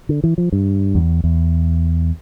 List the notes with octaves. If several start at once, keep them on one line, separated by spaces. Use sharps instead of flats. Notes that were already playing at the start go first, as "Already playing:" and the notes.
D3
E3
F3
G2
E2
E2